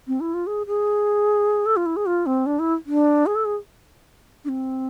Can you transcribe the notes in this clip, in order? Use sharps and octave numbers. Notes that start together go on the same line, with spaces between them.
C4
E4
F4
G#4
G#4
A4
F4
E4
G#4
F4
C4
D4
E4
D4
G#4
A4
G#4
D4
C4